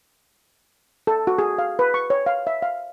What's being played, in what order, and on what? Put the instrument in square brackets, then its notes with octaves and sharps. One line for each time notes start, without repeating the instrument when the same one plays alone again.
[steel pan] A4
F#4
G#4
F5
B4
C#6
C#5
F5
E5
F5